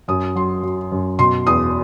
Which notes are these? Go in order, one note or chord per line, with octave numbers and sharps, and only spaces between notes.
F#2 D#6
F#3 C6
F#3
F#2
B2 C6
E2 D#6